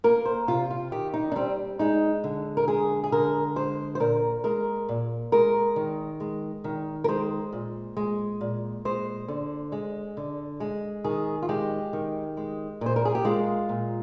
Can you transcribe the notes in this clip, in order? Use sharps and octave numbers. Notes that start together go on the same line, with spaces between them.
A#3 A#4
C5
C3 F4
F4
D#3 G4
D#4
D4
G3 C4
G#3 D#4
D3
A#4
G#3 G#4
G#4
D3 A#4
G#3 C5
C5
A#2 A#4
G#3 A#4
A#2
G#3 A#4
D#3
G#3
D#3
A#4
G#3 C5
A#2
G#3
A#2
G#3 C5
D3
G#3
D3
G#3
D#3 G#4
F4
G#3 G4
D#3
G#3
A#2 C5
A#4
G#4
G4
G#3 F4
A#2